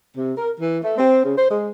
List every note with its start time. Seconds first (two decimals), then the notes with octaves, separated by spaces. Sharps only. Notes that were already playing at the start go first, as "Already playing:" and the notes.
0.16 C3
0.37 A#4
0.59 E3
0.83 A3
0.98 C4
1.24 C#3
1.37 C5
1.51 G#3